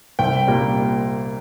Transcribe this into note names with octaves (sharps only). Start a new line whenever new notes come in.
C2 G5
A#2 G3 A#3